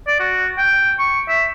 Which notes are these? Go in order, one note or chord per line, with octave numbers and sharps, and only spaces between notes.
D5
F#4
G5
C#6
E5